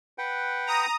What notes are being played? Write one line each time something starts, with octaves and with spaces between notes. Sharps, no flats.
B4 F#5 G5
A#5 D#6